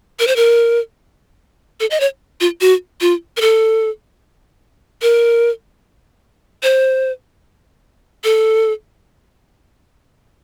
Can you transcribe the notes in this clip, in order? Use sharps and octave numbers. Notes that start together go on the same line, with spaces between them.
A#4
C5
A#4
A4
D#5
C#5
F4
F#4
F4
A#4
A4
A#4
C5
A4